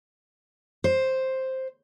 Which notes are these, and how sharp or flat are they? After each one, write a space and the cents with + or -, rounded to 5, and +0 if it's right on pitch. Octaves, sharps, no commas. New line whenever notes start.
C5 +5